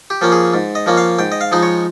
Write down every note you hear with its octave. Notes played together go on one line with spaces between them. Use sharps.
G4
F3 A#3 C#4
G#4
G#2
D#5
F3 A#3 C#4
F5
G#2 G5
D#5
F5
F3 G#3 D#4
C#5